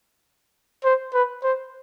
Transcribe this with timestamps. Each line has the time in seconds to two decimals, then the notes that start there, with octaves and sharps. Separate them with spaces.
0.85 C5
1.14 B4
1.43 C5